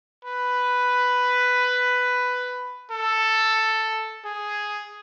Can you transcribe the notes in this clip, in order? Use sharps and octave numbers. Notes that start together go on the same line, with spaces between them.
B4
A4
G#4